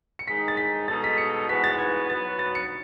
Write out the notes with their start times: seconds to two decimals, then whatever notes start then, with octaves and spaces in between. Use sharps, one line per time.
0.19 C#7
0.27 G#2 D#3 G#3 D#4 B6
0.48 A6
0.57 B6
0.88 B2 G#3 D#4 A4 A6
1.04 B6
1.18 C#7
1.48 G#2 E3 B3 F#4 B6
1.64 A6
1.79 G#6
2.09 F#3 B3 F#4 B4 A6
2.39 A6
2.55 C#7